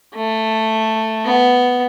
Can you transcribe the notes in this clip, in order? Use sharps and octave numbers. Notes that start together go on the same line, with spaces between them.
A3
B3